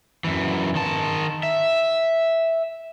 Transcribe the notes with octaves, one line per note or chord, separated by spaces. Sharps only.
F#2 E3
D#3 A5
E5